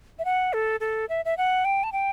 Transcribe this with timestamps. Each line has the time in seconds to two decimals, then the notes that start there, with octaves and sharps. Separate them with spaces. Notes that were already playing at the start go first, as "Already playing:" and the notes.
0.19 E5
0.25 F#5
0.53 A4
0.80 A4
1.09 E5
1.25 E5
1.37 F#5
1.65 G5
1.83 A5
1.92 G5